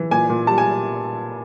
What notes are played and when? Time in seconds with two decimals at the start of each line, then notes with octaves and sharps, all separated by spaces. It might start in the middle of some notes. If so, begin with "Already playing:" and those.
Already playing: E3
0.11 A#2 G#5
0.29 A#2
0.47 G3 A5
0.58 G#5